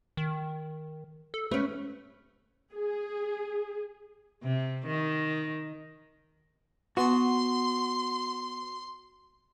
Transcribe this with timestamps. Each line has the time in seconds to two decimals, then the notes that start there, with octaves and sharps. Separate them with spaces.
0.17 D#3
1.34 A4
1.51 A3 C#4 B4
2.72 G#4
4.43 C3
4.86 D#3
6.97 B3 F#4 A5 C6 C#6